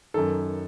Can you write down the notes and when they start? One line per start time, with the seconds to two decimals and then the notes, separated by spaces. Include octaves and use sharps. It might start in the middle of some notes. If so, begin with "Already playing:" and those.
0.14 F#2 D#3 A4